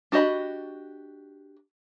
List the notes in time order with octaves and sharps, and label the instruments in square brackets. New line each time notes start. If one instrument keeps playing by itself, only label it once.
[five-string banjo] D4 F#4 G4 D#5 B5